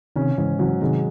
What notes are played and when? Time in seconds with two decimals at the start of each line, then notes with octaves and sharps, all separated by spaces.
0.16 C3 D#3 C#4
0.38 G#2 C#3 E3
0.59 C#3 E3 F#3
0.81 C3 D#3 G#3